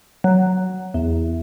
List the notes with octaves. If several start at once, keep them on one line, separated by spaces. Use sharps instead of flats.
F#3
E2